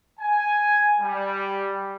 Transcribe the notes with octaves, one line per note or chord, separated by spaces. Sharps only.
G#5
G3